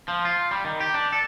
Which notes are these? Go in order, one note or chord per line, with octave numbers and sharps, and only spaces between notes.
F3
F4
G3
D#3
G4
D4
A4